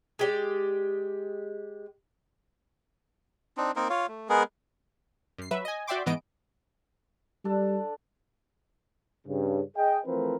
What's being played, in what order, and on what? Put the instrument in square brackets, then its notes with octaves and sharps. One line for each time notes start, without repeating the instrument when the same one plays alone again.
[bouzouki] G#3 G4 D5
[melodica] C4 D4 D#4
A#3 C4 D#4 A#4
F4 C#5 F5
A3
G#3 B3 G#4 A#4
[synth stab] F#2 C7
F#3 B4 E5
D#5 G#5
F#4 D5 E5 G5 C6 D6
G#2 E3 B3 D#5 D7
[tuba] G3 [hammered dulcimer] D4 A4 D5
[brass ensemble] G2 C#3
G#4 D#5 G5
E3 F3 A3 C4 A#4 B4